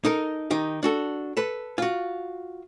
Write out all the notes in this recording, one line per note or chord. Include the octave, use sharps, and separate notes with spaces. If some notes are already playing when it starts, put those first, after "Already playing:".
D#4 A4 A#4
D#3 D#4 G4
D4 F#4 A4
A4 B4
F4 F#4